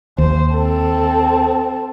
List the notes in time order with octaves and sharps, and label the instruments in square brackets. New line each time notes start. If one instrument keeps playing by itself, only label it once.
[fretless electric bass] D#2 [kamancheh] C5
[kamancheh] C4 A4